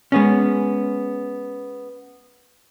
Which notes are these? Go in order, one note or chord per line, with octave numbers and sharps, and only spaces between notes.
G#3 B3 C#4